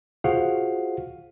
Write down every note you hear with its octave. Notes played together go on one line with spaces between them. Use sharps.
F4 F#4 G#4 C5 F5 F#5